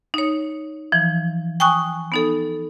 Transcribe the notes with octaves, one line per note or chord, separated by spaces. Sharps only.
D#4 C#5
E3 F3
G5 G#5 C#6 D#6 F#6
B3 D#4 A4